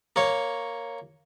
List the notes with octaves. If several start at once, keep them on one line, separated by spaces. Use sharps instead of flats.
A#3 C#5